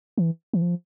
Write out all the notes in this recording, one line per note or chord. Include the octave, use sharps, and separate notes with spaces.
E3
E3
F3